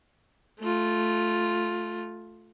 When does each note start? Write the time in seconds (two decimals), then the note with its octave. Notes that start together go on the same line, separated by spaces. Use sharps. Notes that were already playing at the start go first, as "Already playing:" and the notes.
0.59 A3 F4